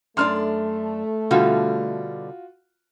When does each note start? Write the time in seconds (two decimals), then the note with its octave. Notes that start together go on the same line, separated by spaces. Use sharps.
0.17 F#2 A3 D4 D5 C6 F6
1.31 B2 D3 G3 F4 F#4